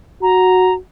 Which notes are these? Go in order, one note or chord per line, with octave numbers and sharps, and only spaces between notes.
F#4 A#5